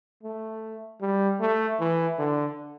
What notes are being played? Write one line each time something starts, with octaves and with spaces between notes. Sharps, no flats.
A3
G3
A3
E3
D3